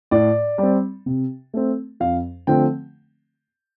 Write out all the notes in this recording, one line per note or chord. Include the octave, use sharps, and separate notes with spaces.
A2 D5
G3 C4
C3
A3 C4
F2 F5
D3 F3 A3 C4 G5